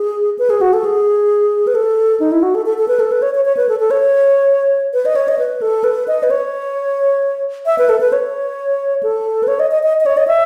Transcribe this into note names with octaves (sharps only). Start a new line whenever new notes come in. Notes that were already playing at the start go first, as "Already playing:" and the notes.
Already playing: G#4
B4
G#4
F#4
A4
G#4
B4
A4
D#4
E4
F#4
A4
A4
A4
B4
A4
B4
C#5
C#5
C#5
B4
A4
A4
C#5
B4
D#5
C#5
D#5
B4
A4
B4
D#5
B4
C#5
E5
B4
A4
B4
C#5
A4
B4
C#5
D#5
D#5
D#5
D#5
C#5
D#5
E5